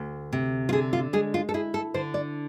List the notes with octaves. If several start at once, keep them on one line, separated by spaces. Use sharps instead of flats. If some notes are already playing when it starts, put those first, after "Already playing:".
Already playing: D2
C3
F4
D3 G#4
F4
G#3 G#4
F4
A4
E4 G#4
A4
D3 C5
D5